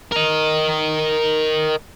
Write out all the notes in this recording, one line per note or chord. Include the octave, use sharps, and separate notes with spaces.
A#4 D#5